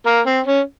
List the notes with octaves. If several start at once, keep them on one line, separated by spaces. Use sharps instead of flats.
A#3
C4
C#4